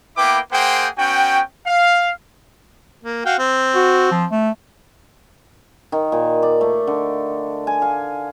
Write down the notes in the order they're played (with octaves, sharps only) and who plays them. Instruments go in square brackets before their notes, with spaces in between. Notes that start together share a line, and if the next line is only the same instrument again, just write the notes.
[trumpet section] A#3 B3 E4 B4 G5 D6
A#3 G#4 C5 F#5 G5
B3 C#4 F#4 G5
F5
[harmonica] A#3
F#4 F5 G5
C4
[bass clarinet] F#4
F3
A3
[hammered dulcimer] D#3
A#2
D5
A3
D3
G#5
F5